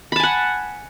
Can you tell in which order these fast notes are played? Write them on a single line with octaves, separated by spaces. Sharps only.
B5 A5 G#5 F#5